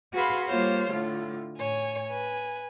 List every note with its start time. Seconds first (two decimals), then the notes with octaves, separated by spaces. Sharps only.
0.14 F#4 G#4 B4 F5 B5 C6
0.48 G3 A#3 F4 C5 C#5 F5
0.91 A2 D3 A3 F4
1.58 A2 C#5 G#5
2.08 B4 G#5